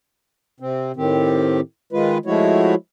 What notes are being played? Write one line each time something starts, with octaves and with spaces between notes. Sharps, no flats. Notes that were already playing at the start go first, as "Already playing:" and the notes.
C3 C4
A2 D#3 C4 G4
D#3 G#3 F4 B4
F3 G#3 A3 E4 F#4 C#5